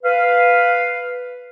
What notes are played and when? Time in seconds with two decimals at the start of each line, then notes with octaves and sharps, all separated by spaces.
0.03 B4 F5